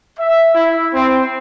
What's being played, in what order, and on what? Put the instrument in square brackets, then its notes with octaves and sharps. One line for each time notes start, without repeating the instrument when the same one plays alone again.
[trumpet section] E5
E4
C4